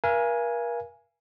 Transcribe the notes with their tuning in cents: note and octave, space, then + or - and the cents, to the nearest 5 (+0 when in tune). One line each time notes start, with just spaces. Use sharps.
A#4 +40 F5 -40 G#5 +0